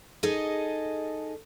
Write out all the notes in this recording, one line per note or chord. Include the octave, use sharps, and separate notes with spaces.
D#4 G#4 A4 D#5